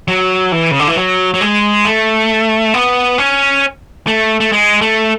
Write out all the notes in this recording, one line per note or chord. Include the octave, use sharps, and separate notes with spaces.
F#3
E3
C#3
D3
E3
F#3
F#3
G#3
A3
B3
C#4
A3
A3
G#3
A3